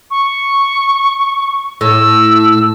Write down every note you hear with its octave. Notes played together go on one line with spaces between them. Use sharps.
C#6
A2 E6